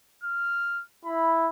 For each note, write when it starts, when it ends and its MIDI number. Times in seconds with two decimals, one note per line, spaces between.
0.23 0.83 89
1.05 1.50 64
1.05 1.32 83